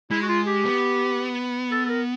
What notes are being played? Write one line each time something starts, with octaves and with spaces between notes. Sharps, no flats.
G#3 E4
F#4
F4
G4
B3
A4
A4
A#4